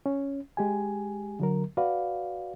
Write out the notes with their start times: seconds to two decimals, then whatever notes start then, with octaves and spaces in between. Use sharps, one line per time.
0.06 C#4
0.57 G#3 G4 G#5
1.40 D3 F#3 A#4
1.77 F#4 B4 D5 F5